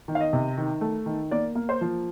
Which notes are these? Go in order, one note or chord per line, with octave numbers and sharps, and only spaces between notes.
D#3
F5
D#5
C3
D#3
A3
D#3
A#3 D5
A#3
C5
F3